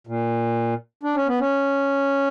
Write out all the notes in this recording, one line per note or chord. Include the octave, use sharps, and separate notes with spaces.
A#2
D4
C#4
B3
C#4